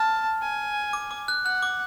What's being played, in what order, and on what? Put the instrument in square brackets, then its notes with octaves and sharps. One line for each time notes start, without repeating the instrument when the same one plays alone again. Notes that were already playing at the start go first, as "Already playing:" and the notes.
Already playing: [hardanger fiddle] A5 [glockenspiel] F6
[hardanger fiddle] G#5
[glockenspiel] D6
D6
F#6
[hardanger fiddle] F#5 [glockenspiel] F#6
[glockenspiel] D6